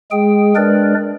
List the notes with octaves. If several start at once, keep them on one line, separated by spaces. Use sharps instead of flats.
G#3 G#4 G5
G#3 D4 A#4 B4 D5